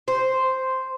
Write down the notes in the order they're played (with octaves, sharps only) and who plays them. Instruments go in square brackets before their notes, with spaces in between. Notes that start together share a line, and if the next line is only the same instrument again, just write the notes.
[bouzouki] C5